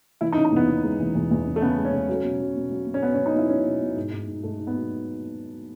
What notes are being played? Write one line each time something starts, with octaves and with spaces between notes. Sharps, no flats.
E3 E4
D#4
C#3
D#4
E2 B3
C#3
G#3
E3
E2
E2
C#3
A3
C#3 B3
G#3
C#4
C#3
F#3
B2
F#3
B2
F#3
B2
C#4
F#3 B3
C#4
F#3
D#4
B2 E4
F#3 C#4
B2
B2
G#2
G#2
G#2
G#2 A3
G#2
B3
F#3